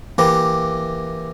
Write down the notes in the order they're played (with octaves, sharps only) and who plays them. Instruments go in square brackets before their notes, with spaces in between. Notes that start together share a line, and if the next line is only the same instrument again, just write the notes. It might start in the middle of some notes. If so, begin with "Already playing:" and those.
[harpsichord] E3 A#3 E4 G4